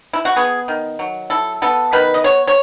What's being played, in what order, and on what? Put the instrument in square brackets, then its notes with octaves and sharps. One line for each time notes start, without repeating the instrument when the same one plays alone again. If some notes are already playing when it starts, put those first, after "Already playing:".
[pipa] E4
F#4
B3 G#4
D#3
F#3
E4 A4
B3 A4
D#3 B4
D#5
B3 C#5
C#5